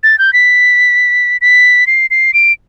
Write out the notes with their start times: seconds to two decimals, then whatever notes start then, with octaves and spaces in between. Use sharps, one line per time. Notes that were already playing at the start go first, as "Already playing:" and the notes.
0.03 A6
0.18 G6
0.33 B6
1.41 B6
1.87 C7
2.10 C7
2.34 D7